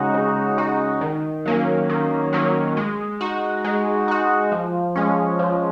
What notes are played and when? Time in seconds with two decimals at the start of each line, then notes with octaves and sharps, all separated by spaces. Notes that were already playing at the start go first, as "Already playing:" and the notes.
Already playing: C#3 G#3 D#4 F#4
0.14 C#3
0.58 G#3 D#4 F#4
1.01 D#3
1.46 F#3 A#3 C#4
1.90 D#3
2.33 F#3 A#3 C#4
2.77 G#3
3.21 D#4 F#4
3.65 G#3
4.08 D#4 F#4
4.52 F3
4.96 G#3 C#4
5.39 F3